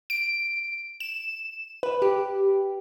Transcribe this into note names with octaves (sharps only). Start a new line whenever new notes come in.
D7
E7
B4
G4